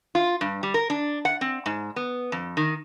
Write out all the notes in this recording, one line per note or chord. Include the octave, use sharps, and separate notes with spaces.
F4
G2
G3
A#4
D4
F#5
C4
G#2
B3
F2
D#3